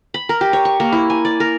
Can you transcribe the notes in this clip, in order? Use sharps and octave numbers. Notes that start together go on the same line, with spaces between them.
B5
A#4
G4
C#5
C#6
A#3
E4
G#5
D5
A#4